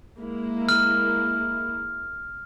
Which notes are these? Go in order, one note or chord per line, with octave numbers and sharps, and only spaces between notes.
G#3 A#3 E4
F6